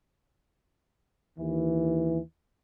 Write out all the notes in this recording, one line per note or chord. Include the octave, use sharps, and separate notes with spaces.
D#2 E3